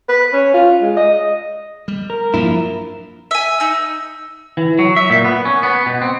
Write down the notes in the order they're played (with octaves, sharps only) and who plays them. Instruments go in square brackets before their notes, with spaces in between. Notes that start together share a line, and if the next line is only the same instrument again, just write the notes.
[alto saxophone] B4
C#4
F4
G#3
D#5
[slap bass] G3
[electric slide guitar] A#4
[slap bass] G2 F#3 D4 [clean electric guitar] F3 A#3 E4
[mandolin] E5 G#5
D#4 E6
[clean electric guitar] E3
F#3
E5
A#2
B3
C#4
B3
B2
C4